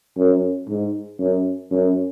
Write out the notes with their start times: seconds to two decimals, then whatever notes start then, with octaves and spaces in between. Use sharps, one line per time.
0.17 F#2
0.69 G#2
1.20 F#2
1.71 F#2